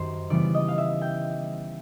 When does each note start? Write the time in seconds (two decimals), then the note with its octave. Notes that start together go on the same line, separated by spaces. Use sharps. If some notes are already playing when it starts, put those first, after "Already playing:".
Already playing: F#2 D#3 G3 C5
0.30 C#3 E3 G3 B3 D5
0.54 D#5
0.68 F5
0.78 E5
1.01 G5